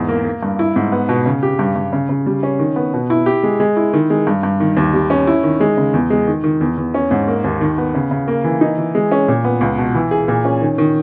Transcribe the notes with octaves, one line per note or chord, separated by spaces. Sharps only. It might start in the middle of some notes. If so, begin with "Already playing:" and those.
Already playing: E2 G#2
A#3
A#3
G2
E4
G#2
B3
B2
C#3
G4
G2
G2
C#3
C#3
G3
C#4
D#3
B3
B2
E4
G4
G#3
G#3
E4
D#3
G#3
G2
G2
D#3
D#2
G3
C#4
E4
D#3
G#3
C#3
E2
G#3
D#3
D#3
E2
E2
C#4
G#2
A#3
D#2
D#3
B3
C#3
C#3
A#3
E3
D#4
E3
G#3
C#4
A#2
B3
C#2
B2
E3
G#4
A#2
C#4
D#3
D#3